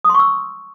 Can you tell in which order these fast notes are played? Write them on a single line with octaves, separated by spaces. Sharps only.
D#6 C6 C#6 E6